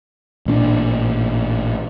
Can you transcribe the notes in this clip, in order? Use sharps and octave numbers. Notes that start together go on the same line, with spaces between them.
A1 A#2 C#4 D4